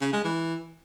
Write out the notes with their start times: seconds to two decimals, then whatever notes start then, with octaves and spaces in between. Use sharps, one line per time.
0.01 C#3
0.13 G#3
0.24 E3